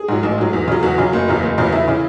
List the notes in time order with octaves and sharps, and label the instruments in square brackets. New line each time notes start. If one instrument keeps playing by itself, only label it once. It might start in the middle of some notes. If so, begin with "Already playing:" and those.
Already playing: [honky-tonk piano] G#4
G#2 F#3
A1
G#2 F#3
E2
C#3 F#3
E2 F#4
C#3 F#3
F#1
E2 C#3 F#3
F#1
E2 C#3 F#3
E2 E4
C#3 E3